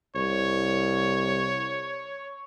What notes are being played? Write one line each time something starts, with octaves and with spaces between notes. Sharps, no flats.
C2 C#5